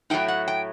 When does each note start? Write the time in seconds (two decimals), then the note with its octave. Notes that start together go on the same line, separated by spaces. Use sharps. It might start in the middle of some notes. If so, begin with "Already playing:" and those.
0.10 A2 F#3 A3 D#4 G5
0.28 F#5
0.48 G5